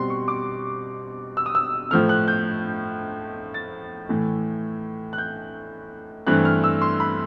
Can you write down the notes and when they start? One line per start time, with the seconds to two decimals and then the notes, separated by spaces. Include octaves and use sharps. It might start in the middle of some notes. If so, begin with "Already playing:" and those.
Already playing: B2 G3 C4 C6
0.10 C#6
0.28 D6
1.37 E6
1.46 D#6
1.55 E6
1.91 A2 F3 A3 F6
2.09 F#6
2.28 G6
3.54 A6
4.09 A2 E3 A3
5.13 F#6
5.18 G6
6.27 G2 E3 A3 C4 F#6
6.45 F6
6.64 E6
6.81 C6
7.00 B5